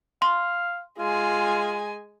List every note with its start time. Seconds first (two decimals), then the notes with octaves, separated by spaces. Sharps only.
0.22 F5 C6
0.99 G#3 F4 G#5